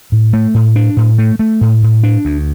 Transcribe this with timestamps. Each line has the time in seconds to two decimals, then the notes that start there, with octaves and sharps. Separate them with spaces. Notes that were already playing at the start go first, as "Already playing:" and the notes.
0.12 A2
0.33 A3
0.54 A2
0.76 D4
0.97 A2
1.18 A3
1.39 A3
1.61 A2
1.83 A2
2.04 D4
2.25 D2